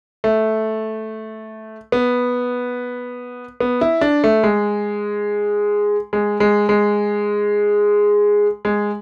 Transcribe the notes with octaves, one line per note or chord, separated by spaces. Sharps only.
A3
B3
B3
E4
D4
A3
G#3
G#3
G#3
G#3
G#3